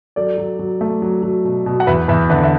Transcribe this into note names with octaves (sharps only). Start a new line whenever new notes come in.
F#3 A4 D5
F#3
F#3
A3
F#3
F#3
B2
B2
F#5
E2 B4 E5
E2 B4 E5
D3 B4 E5
E5